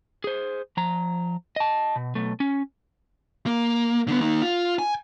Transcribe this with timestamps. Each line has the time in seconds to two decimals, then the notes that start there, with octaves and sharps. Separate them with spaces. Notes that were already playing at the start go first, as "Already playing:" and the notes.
0.24 G#4 C5
0.77 F3 A#5
1.56 D#5 A5
1.96 B2
2.15 B1 A3
2.40 C#4
3.46 A#3
4.08 D3 B3
4.21 D#3 A#3
4.42 F4
4.79 G#5